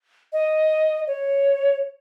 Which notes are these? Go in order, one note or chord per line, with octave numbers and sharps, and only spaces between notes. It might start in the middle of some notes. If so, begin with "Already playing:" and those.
D#5
C#5